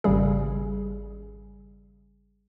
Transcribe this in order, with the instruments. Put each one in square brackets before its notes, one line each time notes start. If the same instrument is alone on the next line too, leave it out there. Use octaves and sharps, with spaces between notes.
[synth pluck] G#1 C#3 G3 G#4